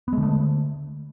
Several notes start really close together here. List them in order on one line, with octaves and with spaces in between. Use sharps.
B3 G#3 D3 A3